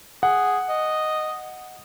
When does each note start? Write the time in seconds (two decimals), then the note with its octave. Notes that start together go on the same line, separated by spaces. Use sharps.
0.23 G#4 F#5
0.69 D#5